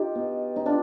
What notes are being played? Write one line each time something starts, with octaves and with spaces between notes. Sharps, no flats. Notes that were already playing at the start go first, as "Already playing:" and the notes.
Already playing: D#4 F4 G4
B2
D#4
D4 F4